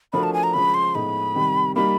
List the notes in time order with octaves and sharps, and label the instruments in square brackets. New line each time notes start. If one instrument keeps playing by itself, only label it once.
[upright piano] F3 A3 D4 F#4 A#4 [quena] B5
[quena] A5
G#5
A#5
[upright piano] C#3 F3 G#3 [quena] B5
[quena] C6
[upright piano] A2 F3 G#3 B3 D#4 [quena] B5
[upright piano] C3 D#3 G3
[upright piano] G3 A#3 D#4 [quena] B5